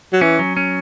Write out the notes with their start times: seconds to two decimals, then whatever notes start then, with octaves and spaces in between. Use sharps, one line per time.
0.13 F#3
0.21 E3 C#4
0.39 F#3
0.57 C#4